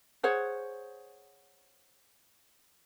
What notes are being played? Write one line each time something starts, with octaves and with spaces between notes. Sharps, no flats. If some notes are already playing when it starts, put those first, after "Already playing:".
G#4 C5 C#5 F#5